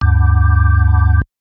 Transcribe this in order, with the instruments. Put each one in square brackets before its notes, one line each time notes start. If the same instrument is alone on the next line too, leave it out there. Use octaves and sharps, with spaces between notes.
[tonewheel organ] D2 G2